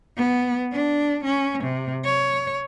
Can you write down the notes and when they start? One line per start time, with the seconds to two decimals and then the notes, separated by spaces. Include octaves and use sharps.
0.17 B3
0.73 D4
1.24 C#4
1.64 C3
2.04 C#5